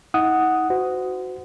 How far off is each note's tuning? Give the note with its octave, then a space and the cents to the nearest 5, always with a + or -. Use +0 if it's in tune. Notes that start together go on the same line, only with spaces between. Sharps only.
D#4 +45 F#5 +0 D#6 +0
F#4 +0 C5 -35